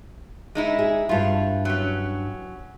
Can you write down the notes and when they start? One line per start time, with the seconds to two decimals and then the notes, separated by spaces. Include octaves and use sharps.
0.55 G#3 D#4 E4
0.79 G#4
1.09 G2 E4 F4
1.65 F#3 C#4